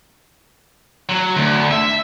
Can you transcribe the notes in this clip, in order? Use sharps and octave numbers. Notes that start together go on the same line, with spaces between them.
F#3
D2
E5